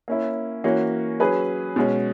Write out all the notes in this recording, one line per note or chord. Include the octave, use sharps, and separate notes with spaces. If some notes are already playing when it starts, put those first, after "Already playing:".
A#3 C#4 E4
E3 A#3 C#4 F#4 C#5
F#3 C#4 G#4 B4
B2 G#3 C#4